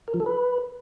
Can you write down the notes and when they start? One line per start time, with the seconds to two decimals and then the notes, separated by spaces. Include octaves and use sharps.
0.08 A#4
0.14 F3
0.20 A4
0.26 B4